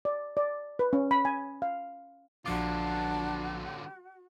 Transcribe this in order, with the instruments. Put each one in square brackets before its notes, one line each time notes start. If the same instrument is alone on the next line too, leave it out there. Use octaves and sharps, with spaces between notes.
[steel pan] D5
D5
B4
C#4
B5
G#5
F5
[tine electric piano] A#1 F3 D6 [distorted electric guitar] D3 F4 [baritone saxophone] D4 [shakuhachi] F#4